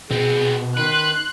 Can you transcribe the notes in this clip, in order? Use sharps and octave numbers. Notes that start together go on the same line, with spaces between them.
B2 B3 C4 G#4
D#3 B4 C6 F#6